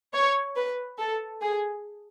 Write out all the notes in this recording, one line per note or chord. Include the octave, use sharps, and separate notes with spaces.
C#5
B4
A4
G#4